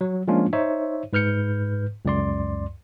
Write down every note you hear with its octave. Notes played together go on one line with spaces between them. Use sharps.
F#3
F3 G#3 A#3 C#4 D4 F4
D#4 C5 C#5 E5
G#2 B4 F6 G6 C#7
C#2 F#2 D5 C6